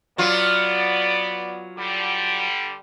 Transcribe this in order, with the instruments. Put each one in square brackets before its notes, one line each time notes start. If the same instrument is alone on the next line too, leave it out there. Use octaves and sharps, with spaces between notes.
[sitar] F#3 F4 [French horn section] B3 D5
[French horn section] D3 G3